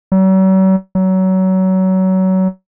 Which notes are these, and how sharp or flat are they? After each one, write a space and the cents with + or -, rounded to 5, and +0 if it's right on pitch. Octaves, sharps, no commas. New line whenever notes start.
F#3 +45
F#3 +25